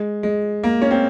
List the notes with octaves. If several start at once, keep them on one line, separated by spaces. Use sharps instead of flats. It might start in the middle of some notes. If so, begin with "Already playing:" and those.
Already playing: G#3
G#3
A#3
C#4
C4